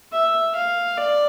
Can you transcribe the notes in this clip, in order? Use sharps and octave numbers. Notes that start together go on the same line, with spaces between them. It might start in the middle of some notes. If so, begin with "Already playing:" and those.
E5
F5
D5